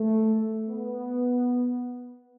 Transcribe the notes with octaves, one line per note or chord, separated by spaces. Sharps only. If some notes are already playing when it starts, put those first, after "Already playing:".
Already playing: A3
B3